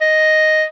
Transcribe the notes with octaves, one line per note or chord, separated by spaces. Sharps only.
D#5